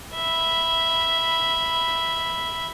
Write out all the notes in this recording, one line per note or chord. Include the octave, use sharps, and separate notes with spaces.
E5 B5